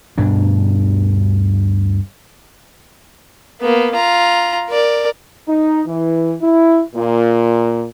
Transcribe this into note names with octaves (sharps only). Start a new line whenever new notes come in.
D2 G2 B2 D4
A#3 B3
F4 A#5
A#4 D5
D#4
E3
E4
A#2